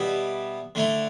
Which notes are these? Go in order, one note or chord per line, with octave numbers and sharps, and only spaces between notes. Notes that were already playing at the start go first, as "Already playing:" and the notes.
Already playing: B2 G3 B3 E4
D3 A3 E4